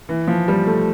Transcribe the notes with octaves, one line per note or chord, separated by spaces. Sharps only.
E3
F3
G3
A3